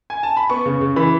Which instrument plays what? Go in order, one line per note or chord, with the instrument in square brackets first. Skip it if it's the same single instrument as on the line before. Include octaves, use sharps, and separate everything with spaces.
[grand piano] G#5
A5
B5
B3 C#6
C#3
C#3
E3 B5